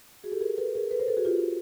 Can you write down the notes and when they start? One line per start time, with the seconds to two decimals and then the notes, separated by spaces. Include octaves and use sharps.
0.24 F#4 G#4
0.32 G4 A4
0.40 G#4 A#4
0.58 A4 B4
0.75 G#4 A#4
0.91 A4 B4
0.99 A#4 C5
1.08 A4 B4
1.17 F#4 G#4
1.25 F4 G4